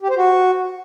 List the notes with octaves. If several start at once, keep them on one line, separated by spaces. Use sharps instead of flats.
G4
C5
F#4